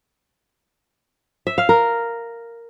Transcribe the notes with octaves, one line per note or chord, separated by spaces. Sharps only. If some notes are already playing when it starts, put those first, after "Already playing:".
E5
F5
A#4